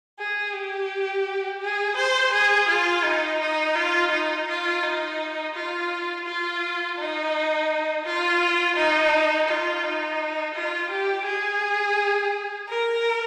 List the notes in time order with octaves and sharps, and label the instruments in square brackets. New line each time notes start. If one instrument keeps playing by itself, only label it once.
[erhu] G#4
G4
G#4
C5
G#4
F4
D#4
D#4
F4
D#4
F4
D#4
F4
F4
D#4
F4
D#4
F4
D#4
F4
G4
G#4
A#4